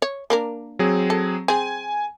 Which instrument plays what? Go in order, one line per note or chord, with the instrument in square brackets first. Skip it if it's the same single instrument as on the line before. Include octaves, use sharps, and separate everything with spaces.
[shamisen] C#5
A#3 D4 A#4
[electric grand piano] F#3 C4 G#4
[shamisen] A4
[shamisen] C4 G#4 [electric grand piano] G#5